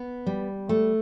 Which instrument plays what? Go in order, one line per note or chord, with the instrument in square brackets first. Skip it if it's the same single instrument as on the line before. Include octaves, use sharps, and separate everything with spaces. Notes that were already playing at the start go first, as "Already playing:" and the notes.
Already playing: [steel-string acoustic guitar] B3
G3
A3